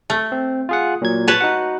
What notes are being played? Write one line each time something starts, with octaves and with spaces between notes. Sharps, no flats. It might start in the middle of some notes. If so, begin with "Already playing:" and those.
A3
C4
F4 G#4 F#5
A#2 F#3 G#6
B4 C#5 A5
D#4 F#4 F#5